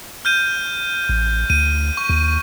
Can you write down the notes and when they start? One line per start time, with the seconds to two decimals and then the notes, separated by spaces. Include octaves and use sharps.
0.25 F6 G6 D#7
1.09 A1
1.50 D2 D#7
1.97 C#6
2.09 D#2